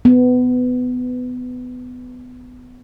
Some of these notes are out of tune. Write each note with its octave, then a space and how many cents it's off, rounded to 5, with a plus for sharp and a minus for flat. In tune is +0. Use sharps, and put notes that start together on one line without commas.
B3 +20